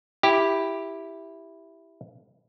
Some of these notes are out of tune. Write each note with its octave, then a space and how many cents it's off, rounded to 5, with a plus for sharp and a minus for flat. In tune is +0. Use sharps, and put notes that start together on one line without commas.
E4 +0 G4 +0